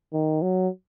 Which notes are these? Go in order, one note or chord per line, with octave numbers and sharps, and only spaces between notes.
D#3
F#3